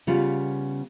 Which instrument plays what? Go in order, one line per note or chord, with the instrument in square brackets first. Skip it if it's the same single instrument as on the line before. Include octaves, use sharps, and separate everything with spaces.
[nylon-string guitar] C#3 G3 B3 F4